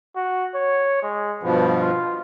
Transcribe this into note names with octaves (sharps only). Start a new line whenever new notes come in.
F#4
C#5
G#3
G2 B2 F3 B3
F4